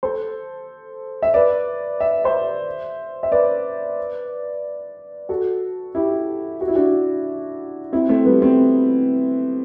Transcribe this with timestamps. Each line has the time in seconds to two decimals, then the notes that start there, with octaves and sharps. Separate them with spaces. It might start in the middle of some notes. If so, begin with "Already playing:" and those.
0.03 A4 C5
1.22 E5
1.34 B4 D5
2.00 E5
2.24 C5 E5
3.23 E5
3.31 B4 D5
5.29 F#4 A4
5.95 E4 G4
6.61 F#4
6.68 E4
6.75 D4 F#4
7.92 C4 E4
8.09 A3 C4
8.25 G3 B3
8.42 A3 C4